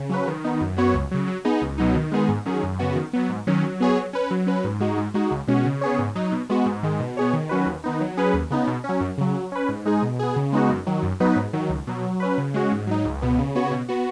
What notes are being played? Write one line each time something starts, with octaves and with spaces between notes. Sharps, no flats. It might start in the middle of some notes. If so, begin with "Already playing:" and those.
Already playing: C#3
F#3 C#4 B4
D#3
B3 D#4
F#2
F#3 B3 F#4 C#5
C#2
C#3 F#3
F#3
B3 D#4 G#4
C#2
B2 F#3 B3 D#4
D#3
G#3 B3 D#4 G#4
G#2
D#3 F#3 C#4 G#4
F#2
C#3 B3 F#4
D#3
F#3 B3
G#2
D#3 F#3 C#4
F#3
B3 G#4 C#5
F#3
C#4 B4
F#3
C#4 B4
G#2
G#3 D#4 F#4
G#2
G#3 D#4 F#4
C#2
B2 G#3 C#4 F#4
C#3
B3 G#4 C#5
G#2
F#3 D#4
B2
G#3 B3 F#4
G#2
D#3 G#3
B2
B3 G#4 C#5
D#3
F#3 C#4 F#4 B4
D#2
D#3 B3 D#4
F#3
C#4 G#4 B4
D#2
C#3 B3 D#4
B2
F#3 C#4
F#2
C#3 F#3
F#3
C#4 B4
G#2
G#3 D#4 G#4
B2
B3 G#4
C#3
G#3 B3 D#4 F#4
F#2
D#3 F#3
F#2
F#3 B3 D#4 B4
G#2
D#3 F#3
C#2
B2 F#3
F#3
C#4 B4
C#3
G#3 C#4 F#4
G#2
F#3 D#4
C#2
B2 B3
C#3
B3 F#4 C#5
B2
B3 F#4